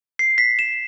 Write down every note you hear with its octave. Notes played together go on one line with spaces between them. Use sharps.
C7
B6
E7